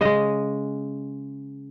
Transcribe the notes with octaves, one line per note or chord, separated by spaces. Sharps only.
C#3 G#3 D#5